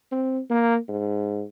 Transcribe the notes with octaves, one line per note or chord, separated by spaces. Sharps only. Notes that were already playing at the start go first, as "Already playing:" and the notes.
C4
A#3
G#2